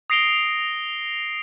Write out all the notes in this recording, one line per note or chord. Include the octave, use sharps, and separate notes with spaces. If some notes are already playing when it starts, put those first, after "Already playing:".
D#6 A#6 C7 D7 F7 G7